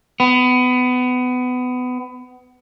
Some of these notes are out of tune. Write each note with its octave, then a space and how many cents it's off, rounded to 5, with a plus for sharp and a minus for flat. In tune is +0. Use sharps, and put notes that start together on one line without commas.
B3 +25